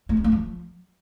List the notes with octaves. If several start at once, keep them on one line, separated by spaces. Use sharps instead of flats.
A3
D4
A3
F3